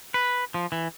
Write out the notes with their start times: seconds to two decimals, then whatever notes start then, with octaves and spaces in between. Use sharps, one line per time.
0.14 B4
0.54 F3
0.72 E3